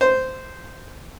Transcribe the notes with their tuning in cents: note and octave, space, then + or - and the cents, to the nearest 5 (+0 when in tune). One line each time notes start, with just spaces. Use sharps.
C5 -10